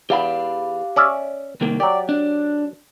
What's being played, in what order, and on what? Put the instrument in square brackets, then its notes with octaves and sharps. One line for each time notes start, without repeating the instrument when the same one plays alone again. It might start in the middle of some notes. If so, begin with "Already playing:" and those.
[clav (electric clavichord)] E2 [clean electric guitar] G4 F5 B5
[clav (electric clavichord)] C#4 D5 E5
[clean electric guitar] C2 D#3 A#3
[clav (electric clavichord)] F#3 G4 [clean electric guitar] D5
[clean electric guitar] D4